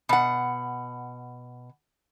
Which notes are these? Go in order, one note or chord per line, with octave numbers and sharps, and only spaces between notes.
B2 F#5